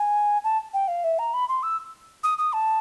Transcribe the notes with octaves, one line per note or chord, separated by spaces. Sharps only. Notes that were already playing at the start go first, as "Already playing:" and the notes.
Already playing: G#5
A5
G5
F5
E5
A#5
B5
C6
E6
D#6
D#6
A5